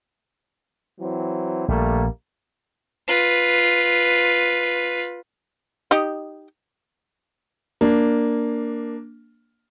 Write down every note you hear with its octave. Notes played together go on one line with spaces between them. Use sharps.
E3 F#3 C4
A#1 G3 A3 A#3
F4 B4
D#4 G4 D#5
A#3 D4